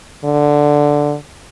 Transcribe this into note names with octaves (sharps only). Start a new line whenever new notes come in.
D3